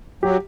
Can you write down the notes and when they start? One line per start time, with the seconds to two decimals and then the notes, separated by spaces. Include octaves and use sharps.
0.23 F#3 G4